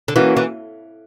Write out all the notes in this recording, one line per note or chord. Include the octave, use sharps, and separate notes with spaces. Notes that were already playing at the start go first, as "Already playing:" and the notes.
D3
E3 A#3 C#4 F#4
E3